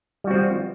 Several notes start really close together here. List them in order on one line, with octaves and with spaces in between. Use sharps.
G3 F#4 C4 F3